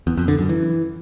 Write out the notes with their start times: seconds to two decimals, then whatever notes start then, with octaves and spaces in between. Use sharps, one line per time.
0.07 E2
0.17 F2
0.28 D3
0.39 F#2
0.49 E3